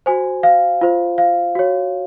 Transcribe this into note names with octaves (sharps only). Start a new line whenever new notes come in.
F#4 C5 G#5
F5
F4 C5
F5
F#4 C#5